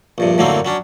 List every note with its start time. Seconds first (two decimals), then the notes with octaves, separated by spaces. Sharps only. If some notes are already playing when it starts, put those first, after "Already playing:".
0.18 A#1 G2 C3
0.38 F#2 A2 D3 F#3 A#3 C4
0.65 F#3 C#4 D4